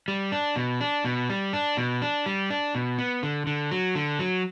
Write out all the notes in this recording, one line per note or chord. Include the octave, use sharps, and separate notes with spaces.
G3
D4
B2
D4
B2
G3
D4
B2
D4
G3
D4
B2
B3
D3
D3
F#3
D3
F#3